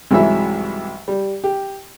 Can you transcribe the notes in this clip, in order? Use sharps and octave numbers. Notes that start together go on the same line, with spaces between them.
C2 G#2 E3 F#3 E5
G3
G4